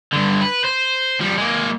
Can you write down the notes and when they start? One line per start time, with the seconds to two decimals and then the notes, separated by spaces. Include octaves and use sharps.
0.13 G2 D3
0.41 B4
0.64 C5
1.20 F3 G3
1.38 G#3 A#3